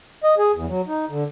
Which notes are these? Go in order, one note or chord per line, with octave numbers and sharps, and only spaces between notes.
D#5
G#4
E2
F#3
D#4
D3